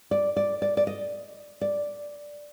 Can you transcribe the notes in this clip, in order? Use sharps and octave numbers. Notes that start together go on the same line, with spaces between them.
D5
D5
D5
D5
D#5
D5